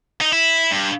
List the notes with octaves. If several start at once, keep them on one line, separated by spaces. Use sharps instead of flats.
D#4
E4
G2